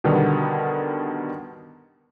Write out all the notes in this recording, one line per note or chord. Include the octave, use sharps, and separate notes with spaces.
B2 D3 D#3 G3 B3